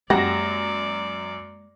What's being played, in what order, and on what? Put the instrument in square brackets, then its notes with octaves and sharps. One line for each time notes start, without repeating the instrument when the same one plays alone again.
[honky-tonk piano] F#2 A#6 [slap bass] G#3 A#3 [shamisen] G4 F#5 [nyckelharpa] D5